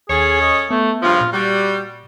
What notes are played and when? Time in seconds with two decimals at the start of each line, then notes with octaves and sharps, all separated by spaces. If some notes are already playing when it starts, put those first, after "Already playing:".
0.10 D#2 C#4 G#4 A4 C#5
0.42 D#5
0.71 A3 B3
1.02 G2 C#3 F3 F4
1.21 A#2
1.33 G3 F#4